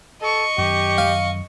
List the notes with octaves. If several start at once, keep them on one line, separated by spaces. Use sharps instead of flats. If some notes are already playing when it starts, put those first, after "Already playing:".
A4 D#5 C#6
F#2 D#3 G4
F5